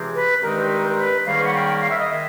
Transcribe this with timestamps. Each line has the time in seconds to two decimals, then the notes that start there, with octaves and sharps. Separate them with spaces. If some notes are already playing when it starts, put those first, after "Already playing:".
Already playing: C#2 C3 E3 G#3 C4
0.14 B4
0.42 G2 D#3 G#3 C4 D#4 A#4
0.69 A#4
0.97 B4
1.25 G#2 D#3 G3 A#3 C#4 F5
1.44 F#5
1.53 G5
1.80 F5
1.90 E5
1.98 D#5
2.08 D#3 G#3 E5